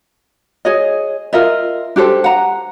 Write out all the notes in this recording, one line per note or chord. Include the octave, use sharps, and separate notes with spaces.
G#4 C#5 D#5
F4 A#4 D#5 E5
D4 G4 A4 C5
F#5 A#5